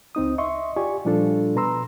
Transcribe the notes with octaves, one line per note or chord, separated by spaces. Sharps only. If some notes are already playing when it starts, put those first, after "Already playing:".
C#2 C4 D#4 D#6
D#5 E5 C6 C#6
F4 G4 D5 G#5 C#6
A#2 F3 G3 D4 F4 A4
B2 B4 A#5 C6 E6